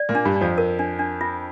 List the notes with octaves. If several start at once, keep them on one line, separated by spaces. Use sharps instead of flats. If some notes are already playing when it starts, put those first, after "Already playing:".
Already playing: D5
A#2 A#3
D4
G2 G3
D4
F2 F3
A#4
D4
D4
F4